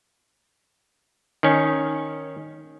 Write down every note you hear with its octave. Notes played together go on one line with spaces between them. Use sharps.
D#3 C#4